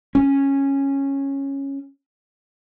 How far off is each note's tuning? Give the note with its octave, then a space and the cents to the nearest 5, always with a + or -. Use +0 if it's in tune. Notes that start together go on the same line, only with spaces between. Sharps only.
C#4 -10